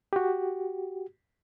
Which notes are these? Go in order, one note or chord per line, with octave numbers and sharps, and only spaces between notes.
F#4 G4